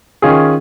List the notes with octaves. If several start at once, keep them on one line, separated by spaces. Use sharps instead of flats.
D#3 C#4 F4 G#4